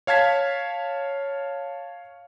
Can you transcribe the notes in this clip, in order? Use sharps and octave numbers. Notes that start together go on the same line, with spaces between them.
C#5 F5 A5 G#6 B6